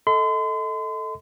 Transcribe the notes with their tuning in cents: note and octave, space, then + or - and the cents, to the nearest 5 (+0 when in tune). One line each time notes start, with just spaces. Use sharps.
A4 +0 D#5 +30 C6 -40